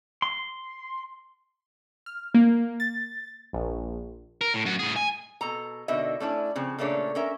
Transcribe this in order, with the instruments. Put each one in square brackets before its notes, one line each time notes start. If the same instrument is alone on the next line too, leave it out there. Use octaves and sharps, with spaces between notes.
[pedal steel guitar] C6
[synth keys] F6
A#3
A6
A#1
[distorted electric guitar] A#4
A2
F#2 F#4
A2 G#4
G#5
[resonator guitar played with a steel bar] B2 A4 A#5
B2 D3 D#3 D#5 E5
A3 C#4 D4 E4
C#3 F3 C4
A#2 C#3 A3 A#3 D4 C#5
C#4 A#4 E5